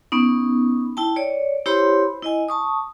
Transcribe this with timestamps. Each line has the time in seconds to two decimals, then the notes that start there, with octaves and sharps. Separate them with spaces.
0.12 B3 C#4 D#4
0.97 E4 G5 A5
1.16 C#5 D5
1.66 E4 G4 C5 C#5 B5 C6
2.22 E4 D#5 G#5
2.49 A5 C#6 D#6